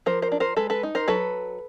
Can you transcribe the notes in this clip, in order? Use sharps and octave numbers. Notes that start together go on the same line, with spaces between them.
F3 A#4 C5
A#4 C5
D4
A#4 C5
G#3 A4 B4
A4 B4
D#4
A#4 C5
F#3 A4 B4